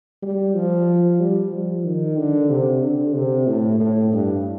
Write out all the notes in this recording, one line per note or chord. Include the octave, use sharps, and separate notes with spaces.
G3
F3
G3
F3
D#3
D3
C3
D3
C3
A2
A2
G2